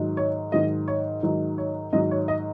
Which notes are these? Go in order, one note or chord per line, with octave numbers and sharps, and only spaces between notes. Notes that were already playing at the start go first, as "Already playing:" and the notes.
Already playing: G#2 D#3 F#3
C#5
G#2 D#3 F#3 D#5
C#5
G#2 D#3 F#3
C#5
G#2 D#3 F#3 D#5
C#5
D#5